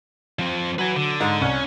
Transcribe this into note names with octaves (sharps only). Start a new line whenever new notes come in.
F3 C4
F#3 B4 G#5
D3
G#2
C2 C#4